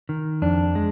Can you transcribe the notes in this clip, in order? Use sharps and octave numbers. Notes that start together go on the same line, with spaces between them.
D#3
F2 D4
G#3